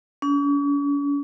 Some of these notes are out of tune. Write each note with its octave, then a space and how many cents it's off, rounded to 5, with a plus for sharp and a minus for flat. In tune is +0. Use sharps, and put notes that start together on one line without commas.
C#4 +45